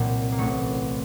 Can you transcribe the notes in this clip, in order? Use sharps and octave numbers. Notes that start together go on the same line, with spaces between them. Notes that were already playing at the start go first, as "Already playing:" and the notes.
Already playing: C2 A#2 F#3 A#3
A#3
A1 A2 F#3 A3